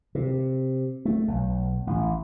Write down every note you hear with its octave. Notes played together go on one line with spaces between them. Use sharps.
C3
A3
B1
A1